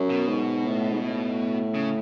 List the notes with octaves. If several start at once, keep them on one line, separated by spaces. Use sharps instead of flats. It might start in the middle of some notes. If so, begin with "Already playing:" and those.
Already playing: F#2
B2
G#2
A2
G#2
A2
C#3